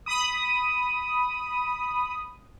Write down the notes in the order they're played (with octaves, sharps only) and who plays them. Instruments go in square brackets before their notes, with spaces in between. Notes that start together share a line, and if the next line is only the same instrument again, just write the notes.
[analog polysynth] B5 D#6